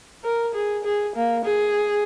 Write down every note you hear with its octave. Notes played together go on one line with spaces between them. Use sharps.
A#4
G#4
G#4
A#3
G#4